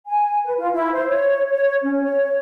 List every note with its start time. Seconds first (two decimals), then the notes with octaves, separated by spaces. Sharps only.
0.07 G#5
0.44 B4
0.58 F4
0.74 E4
0.94 C5
1.09 C#5
1.50 C#5
1.83 C#4
2.02 C#5